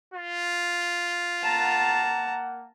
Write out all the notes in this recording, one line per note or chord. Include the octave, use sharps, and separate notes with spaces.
F4
A#3 F#5 A5 A#5